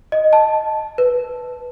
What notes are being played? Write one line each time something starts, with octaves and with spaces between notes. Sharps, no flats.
D#5
A5
B4